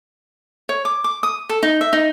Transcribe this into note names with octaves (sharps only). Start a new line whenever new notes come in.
C#5
D6
D6
D#6
A4
D#4
E5
D#4